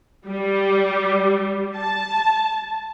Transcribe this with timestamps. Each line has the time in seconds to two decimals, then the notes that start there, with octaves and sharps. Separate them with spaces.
0.26 G3
1.76 A5